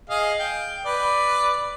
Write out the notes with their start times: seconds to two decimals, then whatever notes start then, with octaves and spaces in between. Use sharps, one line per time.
0.10 G#4 D#5 F5
0.39 G5
0.85 B4 D5